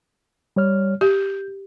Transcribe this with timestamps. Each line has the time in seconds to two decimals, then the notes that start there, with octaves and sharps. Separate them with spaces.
0.56 G3 C#5 F6
1.01 G4 G6